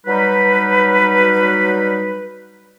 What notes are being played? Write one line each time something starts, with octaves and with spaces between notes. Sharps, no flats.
F#3 G3 D#4 B4